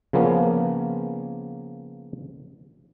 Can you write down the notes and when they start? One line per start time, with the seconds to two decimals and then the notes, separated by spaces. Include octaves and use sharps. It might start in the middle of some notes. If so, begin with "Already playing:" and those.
0.13 C#3 F3 A#3 B3 C#4